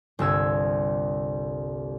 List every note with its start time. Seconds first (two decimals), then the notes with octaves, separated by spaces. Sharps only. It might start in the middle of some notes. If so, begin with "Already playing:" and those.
0.19 G1 C2 E6 G#6